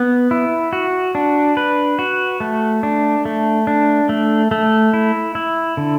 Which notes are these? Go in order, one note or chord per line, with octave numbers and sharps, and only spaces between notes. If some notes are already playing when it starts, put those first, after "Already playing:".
Already playing: B3
E4
F#4
D4
B4
F#4
A3
D4
A3
D4
A3
A3
E4
E4
D3